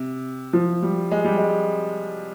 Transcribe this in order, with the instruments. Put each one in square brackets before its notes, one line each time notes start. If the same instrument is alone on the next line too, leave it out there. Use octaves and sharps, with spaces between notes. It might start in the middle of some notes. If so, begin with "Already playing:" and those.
Already playing: [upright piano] C3
F3
G3
G#3
G3
G#3